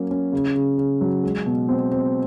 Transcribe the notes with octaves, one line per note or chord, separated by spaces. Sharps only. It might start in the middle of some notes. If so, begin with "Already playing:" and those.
Already playing: F#3 A#3 C#4
C#4
C#3
C#3
C#3
F#3
G#3
B2
C4
C4